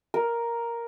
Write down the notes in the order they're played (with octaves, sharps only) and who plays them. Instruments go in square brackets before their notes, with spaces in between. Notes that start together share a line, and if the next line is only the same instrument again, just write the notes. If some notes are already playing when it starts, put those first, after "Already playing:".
[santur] A#4